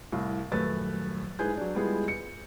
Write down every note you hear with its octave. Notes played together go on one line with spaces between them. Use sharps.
C2 A2 F5
D#1 F#2 A3 B4 A6
G#2 E4 G#4 B4 G#5 G6
F#3 D4
G3 G#3 B3 E4 F4 G#4
C#7